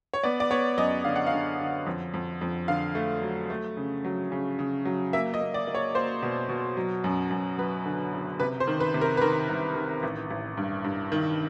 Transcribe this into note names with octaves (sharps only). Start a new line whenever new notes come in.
C#5
B3 D5
D5
B3 C#5
F#2 D#5
D3 F5
F#5
F5
D3
D3
F2
F2
F2
D3 F5
A3
F#3
A3
C#3
F#3
C#3
C#3
F#3
A#3 E5
D#5
A#3
D5
A#3
C#5
A#3 C5
B2
B2
F#3
F#2
F#2
F#3 B4
D3
F#1
C3 B4
C5
D#3
B4
C3
A#4
B4
D#3 A#4
C2
D#3
A1
A1
G2
G2
D#3